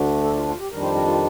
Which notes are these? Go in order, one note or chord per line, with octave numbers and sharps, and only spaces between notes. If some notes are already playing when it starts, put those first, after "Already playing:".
Already playing: D2 D3 A3 D4
A4
F4
F4
G4
F2 D#3 G3 D4 A#4
C5
A#4
F4